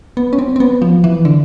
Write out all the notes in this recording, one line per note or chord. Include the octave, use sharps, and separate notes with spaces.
B3
C#4
C4
C4
B3
F3
E3
D3